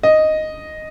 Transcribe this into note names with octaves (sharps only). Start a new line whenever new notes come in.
D#5